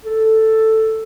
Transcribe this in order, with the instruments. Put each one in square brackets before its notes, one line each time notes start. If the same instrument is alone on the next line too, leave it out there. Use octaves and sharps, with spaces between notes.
[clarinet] A4